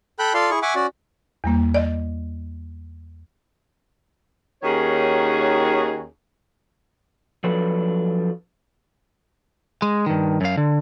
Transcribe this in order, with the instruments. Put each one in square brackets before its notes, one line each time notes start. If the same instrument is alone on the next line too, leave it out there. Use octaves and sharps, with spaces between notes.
[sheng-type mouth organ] A4 G5 B5 F#6
F4 A4 D5 F5 C6
E4 G#4 C#6
E5 F#5 G#5 C#6 D6
C#4 F#4 D5
[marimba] E2 G3 A#3
D5 D#5
[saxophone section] D#2 D#3 C#4 F#4 G#4 C#5
[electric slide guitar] F3 F#3 D4 A4 B4
[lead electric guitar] G#3
G2 D#3
F#2 F5
D3